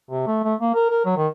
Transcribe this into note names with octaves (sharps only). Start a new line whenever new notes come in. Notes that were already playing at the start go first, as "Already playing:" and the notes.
C3
A3
A3
A#3
A#4
A#4
F#3
D#3